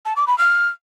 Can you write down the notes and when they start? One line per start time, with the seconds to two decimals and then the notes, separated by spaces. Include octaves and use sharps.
0.05 A5
0.16 D6
0.27 B5
0.38 F6